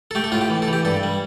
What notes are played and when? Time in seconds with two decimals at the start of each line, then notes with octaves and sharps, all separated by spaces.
0.11 A4
0.15 A3 G4
0.24 A4
0.32 A2 F4
0.41 G4
0.50 E3
0.62 A4
0.68 E3
0.73 G4
0.85 G2 A4
1.03 G3